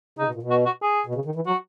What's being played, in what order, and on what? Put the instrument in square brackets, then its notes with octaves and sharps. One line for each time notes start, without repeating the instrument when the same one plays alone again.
[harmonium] C#3 [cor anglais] D#4
[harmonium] B2
A#2
B2
[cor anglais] F#4
F#4
G#4
[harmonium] B2
C#3
D#3
E3
[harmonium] F#3 [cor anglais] F#4